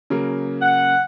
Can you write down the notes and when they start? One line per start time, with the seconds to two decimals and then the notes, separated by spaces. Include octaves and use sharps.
0.10 C#3 F#3 A#3
0.62 F#5